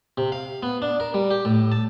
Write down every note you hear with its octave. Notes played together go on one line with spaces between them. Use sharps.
C3
F5
B3
D4
A#4
G3
G4
A2
A5